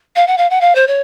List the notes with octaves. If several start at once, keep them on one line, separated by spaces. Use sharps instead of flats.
F5
F#5
F5
F#5
F5
C5
C#5